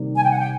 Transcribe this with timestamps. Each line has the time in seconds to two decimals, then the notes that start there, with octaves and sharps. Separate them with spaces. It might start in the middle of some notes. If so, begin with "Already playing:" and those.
Already playing: C3 D#3 G3 A#3
0.16 G#5
0.24 G5
0.32 F#5
0.39 G5